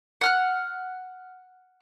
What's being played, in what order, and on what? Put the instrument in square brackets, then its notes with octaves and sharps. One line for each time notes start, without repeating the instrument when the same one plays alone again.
[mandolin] F#5 F6 F#6